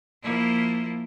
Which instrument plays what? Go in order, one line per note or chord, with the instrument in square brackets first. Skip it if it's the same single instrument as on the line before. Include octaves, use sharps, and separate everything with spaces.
[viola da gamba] F3 A#3 E4